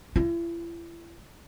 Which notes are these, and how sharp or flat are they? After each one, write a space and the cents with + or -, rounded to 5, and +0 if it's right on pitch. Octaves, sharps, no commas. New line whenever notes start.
E4 +40